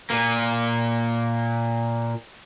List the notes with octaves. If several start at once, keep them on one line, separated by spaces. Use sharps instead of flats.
A#2 A#3